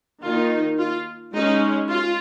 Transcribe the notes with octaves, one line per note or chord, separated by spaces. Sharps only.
D#3 A#3 D#4 F4
F4
G#3 C#4 D#4
F4